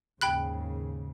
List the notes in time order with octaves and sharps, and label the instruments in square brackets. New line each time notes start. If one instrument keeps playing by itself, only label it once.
[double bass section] D#2 G#2 C#3 [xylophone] G5 B5 F#6